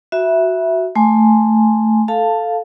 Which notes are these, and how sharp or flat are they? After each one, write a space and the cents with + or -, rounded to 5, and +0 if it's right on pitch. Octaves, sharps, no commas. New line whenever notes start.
F#4 +0 E5 +0 B5 -30
A3 +0 G#5 +0 C6 +0
A4 +0 F5 +0 A5 +10